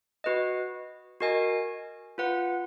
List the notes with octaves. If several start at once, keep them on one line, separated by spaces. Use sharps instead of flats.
F#4 B4 D#5
F#4 A#4 D#5 G#5
F4 B4 F#5